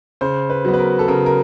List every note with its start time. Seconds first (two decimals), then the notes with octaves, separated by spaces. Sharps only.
0.21 C#3 C5
0.50 B4
0.65 F#3 B3
0.74 B4
0.79 A#4
0.99 A4
1.08 C#3 A#4
1.26 A#4